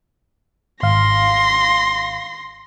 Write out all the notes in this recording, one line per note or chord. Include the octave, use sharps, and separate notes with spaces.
G#1 F5 C6 A#6